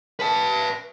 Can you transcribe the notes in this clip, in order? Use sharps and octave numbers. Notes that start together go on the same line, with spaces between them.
B4 A5